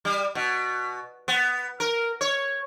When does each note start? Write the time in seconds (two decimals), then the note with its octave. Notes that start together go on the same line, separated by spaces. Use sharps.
0.05 G3
0.35 B2
1.28 B3
1.80 A#4
2.21 C#5